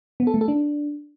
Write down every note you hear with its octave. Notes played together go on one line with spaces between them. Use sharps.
B3
A4
A3
A4
D4